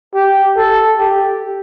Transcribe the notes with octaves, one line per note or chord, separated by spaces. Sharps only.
G4
A4
G4